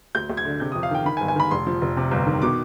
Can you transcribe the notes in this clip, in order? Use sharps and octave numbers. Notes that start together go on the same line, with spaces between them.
D2 G6
D2
G#6
D3
C3 G6
D#6
F2
F5
D#3 G5
D#3 B5
G#5
G1
G#5
D#3 B5
F1 C6
F3
F1
C3
G1
D#3
B2 D6